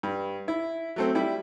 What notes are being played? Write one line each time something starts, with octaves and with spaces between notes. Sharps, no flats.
G2
E4
F#3 A3 C4
G3 E4